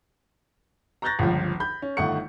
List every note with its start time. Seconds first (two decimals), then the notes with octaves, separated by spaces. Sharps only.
1.02 A#5 C#6 F#6 G6 A6 A#6
1.19 G1 C#2 F3
1.60 B5 G6
1.82 C#4
1.97 G1 D#3 A3 F#5 C#6 C#7